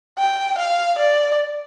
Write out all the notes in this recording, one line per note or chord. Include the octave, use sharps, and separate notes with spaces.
G5
F5
D5